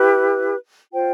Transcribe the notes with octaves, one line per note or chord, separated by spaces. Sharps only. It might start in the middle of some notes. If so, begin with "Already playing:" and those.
Already playing: E4 G4 B4
F4 C5 G5